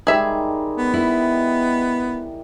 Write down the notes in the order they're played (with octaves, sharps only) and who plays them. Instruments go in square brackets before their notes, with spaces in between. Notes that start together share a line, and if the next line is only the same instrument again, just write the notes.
[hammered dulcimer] D#3 G3 G#3 [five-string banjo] G#4 E5
[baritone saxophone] B3
[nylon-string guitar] E4